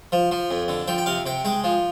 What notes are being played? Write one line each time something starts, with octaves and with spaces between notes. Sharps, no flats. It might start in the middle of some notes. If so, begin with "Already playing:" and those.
F3
F3
F2
D3
F3 G5
G5
C3 F5
C3 G5
G#3 G5
F3